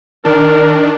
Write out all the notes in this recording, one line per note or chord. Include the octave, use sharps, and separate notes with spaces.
D#3 D4 A#4